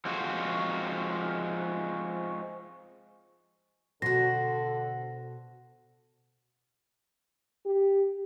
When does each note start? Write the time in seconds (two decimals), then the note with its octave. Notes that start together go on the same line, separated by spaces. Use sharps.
0.05 F3 G#3 C4 F4 F#4
4.02 B2 D3 F#4 A4 C5 A#6
7.65 G4